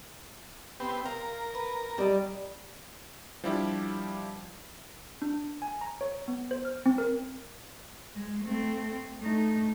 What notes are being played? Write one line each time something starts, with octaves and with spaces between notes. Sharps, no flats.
B3 C4 G4
A#4 F5
B4
G3 D5 D#5
F3 G3 D4 E4 G4
D4
G#5
A#5
C#5
B3
C5
F6
C4
A#4
G#3
A3 C4
A3 D#4